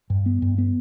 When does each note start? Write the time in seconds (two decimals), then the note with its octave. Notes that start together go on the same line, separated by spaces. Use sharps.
0.10 G2
0.26 B3
0.42 G2
0.58 B3